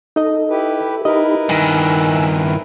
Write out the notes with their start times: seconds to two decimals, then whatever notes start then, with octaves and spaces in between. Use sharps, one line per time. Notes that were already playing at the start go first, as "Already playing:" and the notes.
0.16 D#4 A4 D#5
0.50 E4 G4 B4
1.05 D#4 E4 G4 A#4 B4 D#5 B5
1.49 G2 D#3 G#5 E6 F#6